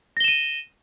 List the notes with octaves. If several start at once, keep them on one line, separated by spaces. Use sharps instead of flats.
A#6 D#7 E7 G7